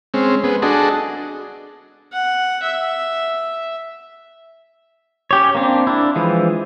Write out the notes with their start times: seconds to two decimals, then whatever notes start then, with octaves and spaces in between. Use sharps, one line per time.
0.14 G#3 C4 C#4
0.44 G#3 B3
0.62 D4 F#4 G#4 A4 D#5
2.12 F#5
2.63 E5
5.31 C#4 G4 C#5
5.55 A#3 C4 D4
5.87 D4 E4
6.16 E3 F3 G#3